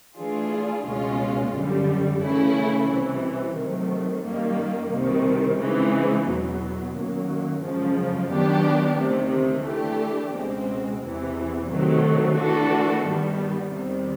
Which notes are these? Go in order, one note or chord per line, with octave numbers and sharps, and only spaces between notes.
E3 A3 D4 F4 G#4
C#2 B2 G#3 C#4 F4
F#2 D3 G3
C#3 E3 A3 C#4 E4
C2 C3 E3
C3 D#3 F#3 A3
F#2 D#3 G3 A#3
C2 C3 D#3
C#3 E3 G#3 C4 D#4
E2 B2 F#3 B3
F#2 D#3 F#3 A#3
F#2 C#3 F3 G#3
D#3 F#3 B3 D4 G4
D2 C3 D#3
E3 A3 D4 G4
C#2 B2 G#3 C4
E2 C3 E3
C3 D#3 F#3 A3
E3 A3 D4 F#4 A4
G2 D#3 G3 B3
E2 C3 D#3 G3